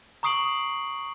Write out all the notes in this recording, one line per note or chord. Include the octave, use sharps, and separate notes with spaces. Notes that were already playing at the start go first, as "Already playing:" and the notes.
A#5 C#6 D#6 C7 D7 F#7